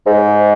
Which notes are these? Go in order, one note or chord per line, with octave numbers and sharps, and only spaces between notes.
G#2